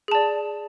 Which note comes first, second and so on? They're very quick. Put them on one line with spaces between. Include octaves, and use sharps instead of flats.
G#4 A5 D5